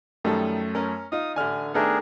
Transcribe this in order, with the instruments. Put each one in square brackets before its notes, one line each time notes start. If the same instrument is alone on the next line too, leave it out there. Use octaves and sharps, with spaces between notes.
[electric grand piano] F#2 A3 [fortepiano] D#3 G3 A4
[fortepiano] C#4 A#4
[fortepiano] D#4 F4 [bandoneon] D#6
[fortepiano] A1 D4 [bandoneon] D3 [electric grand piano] G#5 F6
[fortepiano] D#3 A3 B3 [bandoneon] D4 G#4 A#4